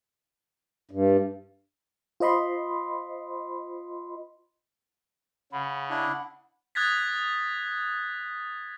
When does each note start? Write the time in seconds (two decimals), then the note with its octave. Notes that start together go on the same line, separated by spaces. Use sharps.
0.91 G2
2.20 F4 C5 D#5 B5 C6
5.52 C#3 F#5 B5
5.90 D4 E4
6.75 D#6 F#6 G#6 A6 B6